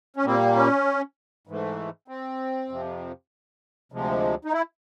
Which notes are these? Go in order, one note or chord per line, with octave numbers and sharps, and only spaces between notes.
C#4
A#2 G3 A#3 C4
C#4
G#2 E3 A3
C4
F2 C3 F3
D2 C3 F3 G#3
D#4
E4